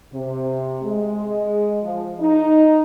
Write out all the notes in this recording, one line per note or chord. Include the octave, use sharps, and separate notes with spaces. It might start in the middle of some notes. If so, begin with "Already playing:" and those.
C3
G#3
F3
D#4